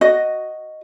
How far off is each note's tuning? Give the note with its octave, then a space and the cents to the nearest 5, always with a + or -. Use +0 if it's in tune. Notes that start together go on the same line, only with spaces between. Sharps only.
F#4 +0 D#5 +0